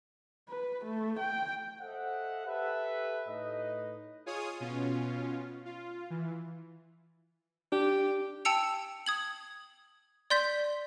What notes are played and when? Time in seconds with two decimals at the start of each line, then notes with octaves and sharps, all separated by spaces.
0.49 B4
0.85 A3
1.19 G5
1.80 A4 C5 D#5 E5 F#5
2.46 G4 A4 B4 E5
3.27 A2 A3 D#4 B4 D#5
4.26 F4 G#4 C#5 G#5 D#6
4.60 B2 C#4 F4
5.65 F4
6.10 E3
7.72 D4 G4
8.45 G5 A5 E6 C#7 F7
9.06 D#6 G#6 F#7
10.30 D5 C6 G6 B6